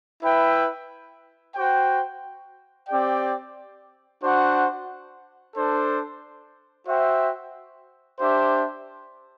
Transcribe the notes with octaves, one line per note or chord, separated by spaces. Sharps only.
E4 B4 E5 G5
F#4 C5 G5
C4 G4 D5 G5
D4 F#4 C5 F#5
D4 A4 C5
F#4 C5 E5 G5
D4 G4 C5 E5